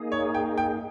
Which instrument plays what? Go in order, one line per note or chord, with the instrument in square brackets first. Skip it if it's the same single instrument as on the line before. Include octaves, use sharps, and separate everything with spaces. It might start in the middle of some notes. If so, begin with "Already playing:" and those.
Already playing: [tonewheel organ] A#3 D#4 G#4
[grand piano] C#5
G5
G5